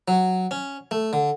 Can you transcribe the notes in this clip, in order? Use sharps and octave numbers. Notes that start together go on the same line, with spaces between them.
F#3
C#4
A3
D3